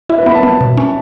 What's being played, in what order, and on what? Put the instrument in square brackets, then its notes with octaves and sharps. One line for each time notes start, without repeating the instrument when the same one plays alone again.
[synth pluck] E4 [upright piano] E5
[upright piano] B4
[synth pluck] B3 [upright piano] B5
[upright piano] A5
[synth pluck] B3
B2
C#4